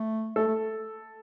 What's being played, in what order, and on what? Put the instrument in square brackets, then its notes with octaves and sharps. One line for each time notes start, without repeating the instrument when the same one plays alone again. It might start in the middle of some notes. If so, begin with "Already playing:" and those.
Already playing: [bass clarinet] A3
[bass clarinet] A3 [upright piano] A4
[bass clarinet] A3